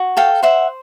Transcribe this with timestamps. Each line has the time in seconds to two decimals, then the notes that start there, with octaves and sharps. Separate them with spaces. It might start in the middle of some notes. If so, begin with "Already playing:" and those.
Already playing: F#4
0.17 A4 F5 G5
0.43 C5 E5 F#5